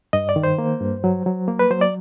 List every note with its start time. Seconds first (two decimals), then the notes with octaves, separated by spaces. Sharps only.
0.13 G2 D#5
0.29 D5
0.36 D#3
0.44 C5
0.58 A#3
0.80 G2
1.04 F#3
1.26 F#3
1.48 A#3
1.59 B4
1.71 F#3 C5
1.81 D5